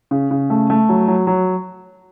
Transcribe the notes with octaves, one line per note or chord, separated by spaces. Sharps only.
C#3
C#3
A3
A3
F#3
F#3
F#3